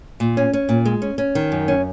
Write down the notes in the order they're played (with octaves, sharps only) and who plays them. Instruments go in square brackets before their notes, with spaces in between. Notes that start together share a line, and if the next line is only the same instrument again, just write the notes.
[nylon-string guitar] A#2
C#4
C#4
A#2
G#3
C#4
C#4
D#3
F#2
C#4